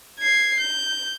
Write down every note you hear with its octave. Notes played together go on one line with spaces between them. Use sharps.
G#6 C7
G6